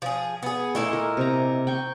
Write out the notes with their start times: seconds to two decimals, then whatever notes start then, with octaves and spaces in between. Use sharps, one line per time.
0.02 F3 G#4
0.42 B3 G#4
0.75 A#2 A3 E4 D#5
0.93 A#4
1.17 C3 A#5
1.67 G5 C#6